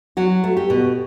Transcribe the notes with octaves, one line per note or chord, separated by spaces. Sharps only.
F#3 F#4
A3
G4
B2